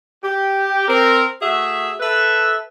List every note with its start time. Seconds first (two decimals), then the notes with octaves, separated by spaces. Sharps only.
0.24 G4
0.88 C4 A#4
1.42 A3 F#4 G#4 E5
2.00 A4 B4 E5